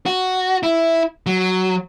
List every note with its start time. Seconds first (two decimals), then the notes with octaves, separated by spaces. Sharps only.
0.06 F#4
0.63 E4
1.26 F#3